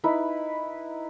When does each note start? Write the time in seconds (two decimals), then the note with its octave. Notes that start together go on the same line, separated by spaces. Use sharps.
0.04 D#4 E4 B4